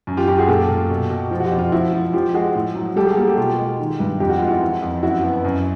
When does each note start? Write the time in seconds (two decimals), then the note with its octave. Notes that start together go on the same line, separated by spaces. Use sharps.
0.07 F#2
0.17 F4 G4
0.27 F#2 F4 G4
0.38 F#4 G#4
0.48 A#2 G4 A4
0.70 A#2
0.90 B2
1.10 B2
1.31 F3
1.40 F#4
1.44 F4 G4
1.51 F2
1.59 F4
1.72 F3 E4 F#4
1.93 F3
2.13 F3 F4 G4
2.34 G#3 F#4 G#4
2.55 A2
2.75 F#3
2.96 G3 G4 A4
3.07 F#4 G#4
3.17 A#3 G4 A4
3.27 G4 A4
3.37 B2 F4 G4
3.59 G#3
3.79 D#3
4.00 G2
4.20 F2 G4
4.29 F#4
4.39 G#3 F4
4.48 E4 F#4
4.62 E3
4.82 F2
5.03 F#2 E4 F#4
5.24 B3
5.45 F#2